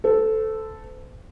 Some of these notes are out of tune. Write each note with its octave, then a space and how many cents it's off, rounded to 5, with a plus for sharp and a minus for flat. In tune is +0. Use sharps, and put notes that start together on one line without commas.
A4 +0 C5 -40